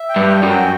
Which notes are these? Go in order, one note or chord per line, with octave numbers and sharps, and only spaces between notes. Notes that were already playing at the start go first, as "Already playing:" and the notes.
Already playing: E5
G5
G2
G5
F#2
F#4